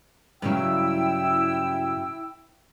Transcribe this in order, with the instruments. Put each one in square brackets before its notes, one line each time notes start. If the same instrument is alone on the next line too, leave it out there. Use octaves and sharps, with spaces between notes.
[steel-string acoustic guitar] G2 C#3 F#3 [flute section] E4 G5 E6